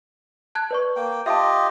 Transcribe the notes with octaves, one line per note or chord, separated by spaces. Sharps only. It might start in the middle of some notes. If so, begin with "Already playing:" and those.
A5 F#6 G#6
B4 D5 C#6
A#3 G5
F4 G4 D#5 E5 A5